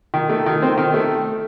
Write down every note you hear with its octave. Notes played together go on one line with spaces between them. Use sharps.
D#3
A3
D#3
C4
D#3
A3